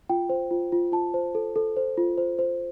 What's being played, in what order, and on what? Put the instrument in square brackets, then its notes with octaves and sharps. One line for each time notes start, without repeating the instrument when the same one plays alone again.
[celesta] F4 G5
C5
F4
F4
F4 A5
C5
A4
A4
C5
F4
C5
C5